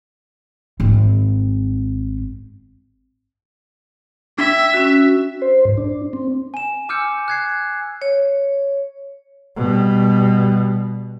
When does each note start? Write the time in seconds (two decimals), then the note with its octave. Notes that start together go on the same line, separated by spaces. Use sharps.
0.80 G#1 C4
4.38 D4 E5
4.74 C#4 F#4
5.42 C5
5.65 G#2
5.78 D4
6.13 C4
6.54 G#5 E7
6.89 G#5 D6 E6 F6 G6 C#7
7.28 F#6 G#6 C7
8.02 C#5
9.57 B2 G3